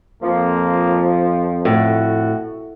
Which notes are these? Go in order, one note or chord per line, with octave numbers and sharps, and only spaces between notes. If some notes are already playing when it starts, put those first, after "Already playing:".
F2 F3 A#3
A2 F#4